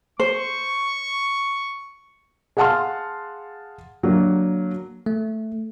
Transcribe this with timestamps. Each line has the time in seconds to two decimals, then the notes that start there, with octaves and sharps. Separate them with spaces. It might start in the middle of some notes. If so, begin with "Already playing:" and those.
0.20 C5 C#6
2.57 G#4 F5 F#5 A5 C6 F6
4.03 D3 F#3 A#3
5.06 A3